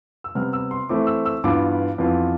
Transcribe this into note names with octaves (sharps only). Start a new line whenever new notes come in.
E6
C3 G3 B3 F6
E6
C6
E3 A3 C4 E4 D6
E6
E6
G2 E3 B3 F4 D6
F2 E3 B3 F4